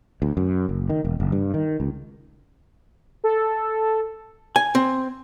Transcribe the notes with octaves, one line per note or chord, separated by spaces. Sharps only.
D2
F#2
F#1
D#3
E1
F#1
G2
D#3
C#2
A4
G#5
C4